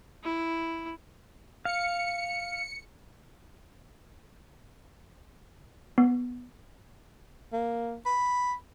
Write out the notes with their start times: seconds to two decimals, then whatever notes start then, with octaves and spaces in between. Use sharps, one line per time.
0.24 E4
1.65 F5 C#7
5.98 B3
7.53 A#3
8.06 B5